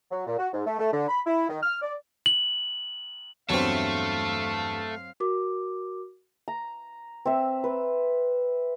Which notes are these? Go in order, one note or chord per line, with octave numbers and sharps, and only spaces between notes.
F#3
A#2
F#4
G#2
A3
A3
D3
B5
E4
D#3
F6
D5
F#7
E2 G2 F#3 A3 C4 A4 F5 C#6
F#4 A#4 D6
A#5
C4 E5
B4